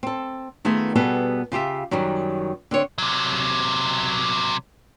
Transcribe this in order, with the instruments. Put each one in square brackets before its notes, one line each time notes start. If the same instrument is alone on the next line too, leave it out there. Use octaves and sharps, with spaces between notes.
[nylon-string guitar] C4 A4
D#3 A3 B3 F4 G#4
B2 G3 B3 G#4 A4
C#3 F4 G4 E5
F#2 D#3 F#3 G3
D3 C4 C#5
[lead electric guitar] C3 F#3